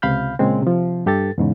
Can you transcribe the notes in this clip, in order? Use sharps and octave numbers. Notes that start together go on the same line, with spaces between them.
C#2 C3 F5 B5 F6 G6
A#2 C#3 G#3 C4
C3 F3
G2 G4 A4 A6
E2 G#2 C#3